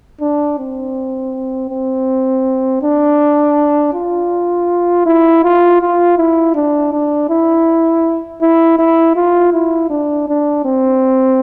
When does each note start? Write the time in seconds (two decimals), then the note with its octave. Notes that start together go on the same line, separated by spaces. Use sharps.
0.21 D4
0.59 C4
1.71 C4
2.82 D4
3.93 F4
5.06 E4
5.44 F4
5.81 F4
6.18 E4
6.55 D4
6.93 D4
7.30 E4
8.42 E4
8.79 E4
9.16 F4
9.53 E4
9.90 D4
10.28 D4
10.65 C4